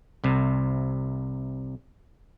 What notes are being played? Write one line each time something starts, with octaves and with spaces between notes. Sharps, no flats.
C2 C3